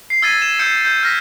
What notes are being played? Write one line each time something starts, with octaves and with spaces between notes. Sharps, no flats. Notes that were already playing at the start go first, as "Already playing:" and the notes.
C7
E6 G#6 A6 B6 D#7
E7
E6 G6 C#7
G6
F6 A#6 B6